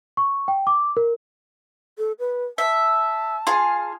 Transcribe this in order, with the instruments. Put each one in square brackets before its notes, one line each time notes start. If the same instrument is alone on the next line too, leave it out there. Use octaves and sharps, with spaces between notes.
[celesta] C#6
G5
D6
A#4
[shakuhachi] A4
B4
[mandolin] E5 [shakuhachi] A5
[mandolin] F4 G#4 F5